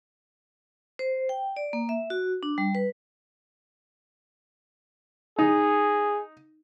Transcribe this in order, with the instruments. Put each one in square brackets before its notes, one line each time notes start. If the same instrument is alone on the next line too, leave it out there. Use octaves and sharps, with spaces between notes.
[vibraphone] C5
G5
D5
A#3
E5
F#4
D4
G3
B4
[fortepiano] D#4 [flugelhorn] G#4